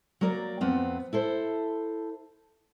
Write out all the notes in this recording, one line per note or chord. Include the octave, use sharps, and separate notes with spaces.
F#3 A#3 A#4 D5
F2 B3 C4
E4 A4 C5